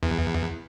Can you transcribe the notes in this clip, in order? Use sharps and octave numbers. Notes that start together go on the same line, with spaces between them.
E2